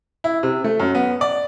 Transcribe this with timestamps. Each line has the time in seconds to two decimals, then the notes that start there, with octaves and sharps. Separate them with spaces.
0.24 E4
0.43 C3
0.64 A3
0.80 F#2
0.95 B3
1.21 D5